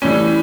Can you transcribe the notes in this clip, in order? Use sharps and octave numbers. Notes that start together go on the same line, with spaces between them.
A2 E3 G3 C#4